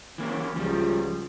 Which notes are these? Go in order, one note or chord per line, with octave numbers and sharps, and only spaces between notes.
E3 A#3 C#4
C#2 F3 G3